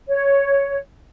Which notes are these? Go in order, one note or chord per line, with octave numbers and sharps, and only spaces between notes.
C#5